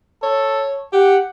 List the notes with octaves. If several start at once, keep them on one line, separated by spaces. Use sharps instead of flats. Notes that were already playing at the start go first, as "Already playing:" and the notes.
A4 C#5
G4 F#5